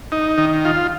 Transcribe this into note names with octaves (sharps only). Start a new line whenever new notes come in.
D#4
D#3
F4